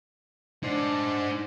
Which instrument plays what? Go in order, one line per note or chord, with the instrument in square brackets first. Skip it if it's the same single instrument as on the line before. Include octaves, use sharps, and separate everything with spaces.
[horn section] D4 [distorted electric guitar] D#4 C5